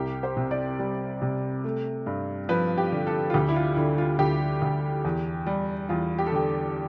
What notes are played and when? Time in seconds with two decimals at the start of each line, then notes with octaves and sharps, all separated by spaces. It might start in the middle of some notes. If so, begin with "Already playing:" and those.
Already playing: C2 G4
0.23 C5
0.37 C3
0.51 D5
0.79 G3
1.22 C3
1.64 A3
2.06 G2
2.49 F3 B4
2.78 G4
2.92 D3
3.07 A4
3.30 F4
3.34 D2 G4
3.49 E4
3.56 F4
3.77 D3 E4
3.98 F4
4.19 D2 G4
4.62 D2
5.05 E2
5.46 G3
5.89 E2 F4
6.19 G4
6.27 A4
6.32 D3 G4